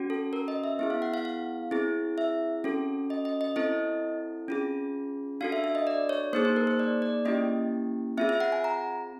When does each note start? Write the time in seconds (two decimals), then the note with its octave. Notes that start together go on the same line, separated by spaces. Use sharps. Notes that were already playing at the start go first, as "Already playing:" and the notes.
Already playing: C#4 F#4
0.10 A4
0.33 A#4
0.48 D#5
0.64 E5
0.79 B3 E4 G#4 E5
0.90 F5
1.02 F#5
1.14 F5
1.25 F5
1.71 C4 E4 G#4
2.18 E5
2.64 C#4 F#4 A4
3.10 D#5
3.25 D#5
3.41 D#5
3.56 C4 E4 A4 D#5
4.48 C#4 F4 G#4
5.41 D4 F#4 A4 F5
5.52 E5
5.64 E5
5.75 D#5
5.87 D5
6.09 C#5
6.33 A#3 D#4 G#4 C5
6.45 C5
6.56 A#4
6.67 C5
6.79 D5
7.02 D5
7.25 A#3 C#4 E4 G4 D#5
8.18 C4 F4 G#4 E5
8.29 E5
8.40 F#5
8.52 G#5
8.64 A#5